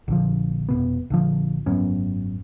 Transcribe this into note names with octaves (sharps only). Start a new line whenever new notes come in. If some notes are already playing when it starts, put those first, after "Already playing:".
A#1 D3 F3
F1 B2 B3
A#1 D3 F3
G#1 F#2 B3 C#4